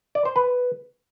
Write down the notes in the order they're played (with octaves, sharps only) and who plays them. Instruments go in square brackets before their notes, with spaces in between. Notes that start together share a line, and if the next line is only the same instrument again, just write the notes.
[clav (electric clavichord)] D5
C5
B4